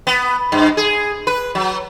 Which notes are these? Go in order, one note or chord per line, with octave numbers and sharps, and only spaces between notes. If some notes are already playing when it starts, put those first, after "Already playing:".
B3
G2
G#4
B4
F#3